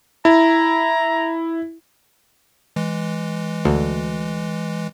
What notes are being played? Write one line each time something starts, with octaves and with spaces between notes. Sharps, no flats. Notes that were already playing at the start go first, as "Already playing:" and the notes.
E4 A#5
E3 G#3
D2